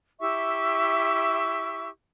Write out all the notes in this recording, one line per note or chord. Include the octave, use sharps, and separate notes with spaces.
E4 G4 E5 C#6